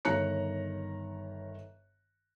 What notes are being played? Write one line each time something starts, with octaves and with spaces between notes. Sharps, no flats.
G1 D#3 C#5 A#5 F#6 C#7